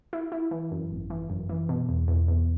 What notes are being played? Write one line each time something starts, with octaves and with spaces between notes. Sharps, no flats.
E4
E4
E3
F#2
G#1
E3
F#2
E3
B2
E2
E2
E2